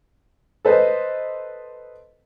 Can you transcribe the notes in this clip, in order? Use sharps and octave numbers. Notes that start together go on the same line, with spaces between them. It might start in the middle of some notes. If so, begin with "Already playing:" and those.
A4 B4 C5 D#5